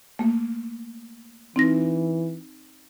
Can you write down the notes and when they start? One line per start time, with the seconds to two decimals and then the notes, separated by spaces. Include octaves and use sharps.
0.19 A3 A#3
1.56 E3 C4 D#4 A#6